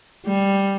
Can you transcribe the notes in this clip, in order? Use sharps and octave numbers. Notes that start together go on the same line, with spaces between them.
G3